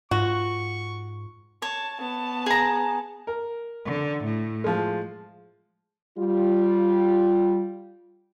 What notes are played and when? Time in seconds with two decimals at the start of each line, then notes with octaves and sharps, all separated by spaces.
0.11 G#2 F4 F#4 C#6
1.62 C#5 A5
2.00 B3 A5
2.46 G#4 A#5
3.27 A#4
3.86 D3
4.24 A2
4.64 F3 G#3
6.19 G3 F4